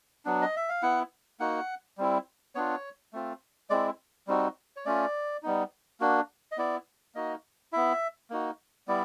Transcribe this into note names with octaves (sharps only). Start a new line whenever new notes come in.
F#3 B3 D4
D#5
E5
F5
B3 E4 F#5
A#3 D#4 F#4 F#5
G3 C4 E4
B3 D4 F4 C#5
A3 C4 F4
G#3 C4 E4 D5
G3 C4 D#4 F#4
C#5
A3 C#4 F4 D5
G3 B3 D#4
A#3 D4 F#4
D#5
B3 E4 D5
A#3 D#4 F#4 D#5
B3 E4 E5
A#3 D#4 F#4
G3 B3 E4 D5